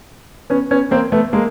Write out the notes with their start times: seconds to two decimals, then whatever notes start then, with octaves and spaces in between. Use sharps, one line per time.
0.50 B3 C#4
0.71 B3 C#4
0.91 A#3 C4
1.12 A3 B3
1.33 G#3 A#3